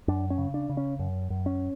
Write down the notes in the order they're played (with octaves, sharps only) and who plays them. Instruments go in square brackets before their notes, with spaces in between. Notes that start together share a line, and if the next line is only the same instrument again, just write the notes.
[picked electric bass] F#2 D4
C#4
C#3
D4
C#3
C#4
F#2
F#2
C#4